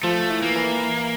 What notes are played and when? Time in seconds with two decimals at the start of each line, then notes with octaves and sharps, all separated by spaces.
0.03 F3 A3
0.30 E3
0.42 A#3
0.56 E3